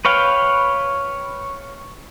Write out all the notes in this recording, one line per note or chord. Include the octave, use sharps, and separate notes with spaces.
B4 C#5 F5 G5